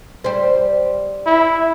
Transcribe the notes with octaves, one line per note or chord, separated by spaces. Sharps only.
G3 C5
E4